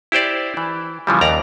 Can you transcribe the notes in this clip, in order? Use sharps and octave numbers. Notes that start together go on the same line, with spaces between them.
E4 G4 C5 D5
E3
C#3 E3 F3 G3
D#2 D5 A#5